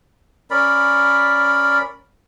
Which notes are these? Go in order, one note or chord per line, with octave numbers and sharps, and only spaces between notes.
C#4 A#4 D5 B5